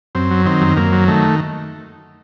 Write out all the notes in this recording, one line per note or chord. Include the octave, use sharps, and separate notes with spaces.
F#2 C4
F#3
D#3 C4
F#2
F#2 A#3
F#3
D#3 A3